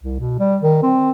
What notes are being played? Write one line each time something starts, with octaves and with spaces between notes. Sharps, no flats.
C2
B2
G3
D#3
C4